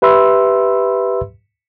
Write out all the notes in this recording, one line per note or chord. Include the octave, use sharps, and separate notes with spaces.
G4 B4 E5 B5 C6 E6